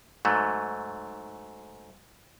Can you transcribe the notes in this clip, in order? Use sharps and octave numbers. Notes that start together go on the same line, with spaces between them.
G#2 F#3 A3